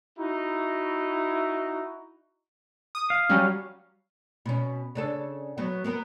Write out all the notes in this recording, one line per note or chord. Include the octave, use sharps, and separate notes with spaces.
D#4 E4 F#4
D#6
F5
F#3 G3 C#4
B2 C#4
C#3 D4 A4
F#3 B3
A#3 B3 A#4